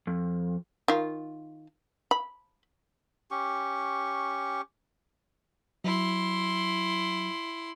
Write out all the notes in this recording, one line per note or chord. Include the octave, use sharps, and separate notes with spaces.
F2
D#3 F4
B5
C#4 G4 C#6
F#3 E4 C6